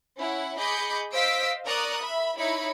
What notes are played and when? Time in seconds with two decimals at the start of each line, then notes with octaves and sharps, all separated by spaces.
0.19 C#4 E4 F#5
0.58 G#4 D#5 B5 D6 G6 C#7
1.13 C5 D#5 F5 E6 B6 D7
1.67 A#4 D5 A#5 C#6 D#6 F#6
2.01 E5 B5
2.38 D#4 E4 C#5 B5 C#7